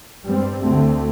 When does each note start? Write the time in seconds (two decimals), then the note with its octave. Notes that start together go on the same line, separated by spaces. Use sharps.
0.24 G2 G3 C4
0.61 D2 D3 A3 C4